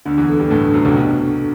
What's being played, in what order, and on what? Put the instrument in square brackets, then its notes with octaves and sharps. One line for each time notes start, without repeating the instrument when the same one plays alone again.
[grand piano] D2 D3 [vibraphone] D4
[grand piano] E2 E3
[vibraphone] A4
[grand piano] G2 G3
[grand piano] A2 A3 [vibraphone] D4
[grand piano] F#2 F#3 [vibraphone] C5
[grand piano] C2 C3
[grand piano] B1 B2 [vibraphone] D4
[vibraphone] A4